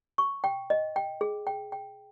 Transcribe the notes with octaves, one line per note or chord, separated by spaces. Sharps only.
C#6
G5
D#5
G5
G#4
G5
G5